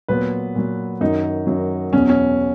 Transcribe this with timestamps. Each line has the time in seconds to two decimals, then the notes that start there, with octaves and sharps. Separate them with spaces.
0.08 A#2 F#3 B3 B4
0.55 A#2 F#3
1.01 F#2 D#3 F#3 D#4
1.47 F#2 D#3 F#3
1.93 E2 B2 F#3 C#4
2.09 C#4